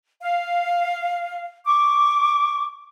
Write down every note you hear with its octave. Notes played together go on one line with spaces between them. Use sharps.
F5
C#6 D6